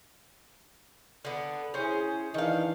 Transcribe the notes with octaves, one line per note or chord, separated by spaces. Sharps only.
D3 B3
C#4 E4 G#4 C5
D#3 E3 D4 D#4 F5